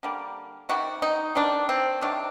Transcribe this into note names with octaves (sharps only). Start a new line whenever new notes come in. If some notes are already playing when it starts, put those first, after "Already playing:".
D3 G3 A#3
C3 D#3 G3 F#4
D#4
D#3 G3 A#3 D4
C4
C3 D#3 F#3 D4